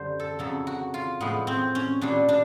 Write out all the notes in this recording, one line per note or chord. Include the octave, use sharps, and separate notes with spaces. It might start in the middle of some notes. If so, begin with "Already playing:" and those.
Already playing: F#2 D3 G3 C5
A4
F2 C#3 F#3 A4
F#4
F4
A2 F3 G#3 B3
C4
C#4
A#2 G3 D4
D4